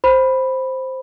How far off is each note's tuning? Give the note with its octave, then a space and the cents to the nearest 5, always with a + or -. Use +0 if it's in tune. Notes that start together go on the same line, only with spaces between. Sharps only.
C5 +0 B5 +0